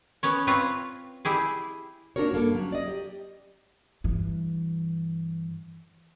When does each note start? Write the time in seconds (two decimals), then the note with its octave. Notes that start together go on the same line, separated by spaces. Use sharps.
0.23 B3 C#4 C#5
0.47 C4 F4 B4 C#5
1.25 E4 G4 G#4
2.16 A#3 D4 D#4 F#4 A#4 C#5
2.32 G2 A#3 A4
2.54 F#3 C#4
2.72 D5 D#5
2.88 G4
4.04 G2 E3